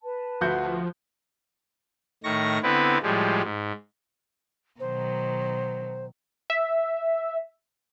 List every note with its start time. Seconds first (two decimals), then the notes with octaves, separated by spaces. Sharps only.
0.03 B4 A5
0.41 D2 F3 F#4 G6
2.24 A2 D#3 C#6 A#6
2.63 D3 B3 C4 E4 B4
3.03 A2 F3 G3 G#3
3.43 G#2
4.80 B2 D#3 F#3 C5
6.50 E5